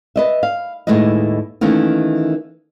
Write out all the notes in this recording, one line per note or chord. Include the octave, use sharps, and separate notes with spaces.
B4 D#5 E5
F5
D#2 A2 G#3 E4 B4 D#5
D#3 E3 A3 A#3 C#4